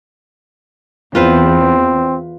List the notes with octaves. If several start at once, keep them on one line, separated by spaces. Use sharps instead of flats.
E2 C4 F4 B4 C5